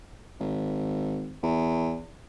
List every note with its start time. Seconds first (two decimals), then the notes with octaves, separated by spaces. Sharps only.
0.40 G#1
1.43 E2